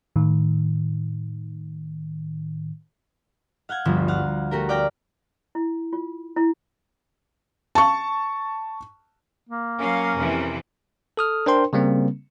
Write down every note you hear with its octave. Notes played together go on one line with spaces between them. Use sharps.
A2 D#3
F5 F#5 G6 G#6
G1 D2 F3
F5 F#5
A3 F#4 G4 A#4
D5 F5 G5 D6 A#6
E4
F4
E4
A5 C#6
A#3
F#3 C#4 A#4 F5
F2 C3 E3
A4 D#6 F6
D4 A#4 C5 G5 C6
C#3 G3 A#3 C4